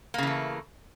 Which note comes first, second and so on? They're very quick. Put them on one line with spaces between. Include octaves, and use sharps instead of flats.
A#3 C#3 E3 A3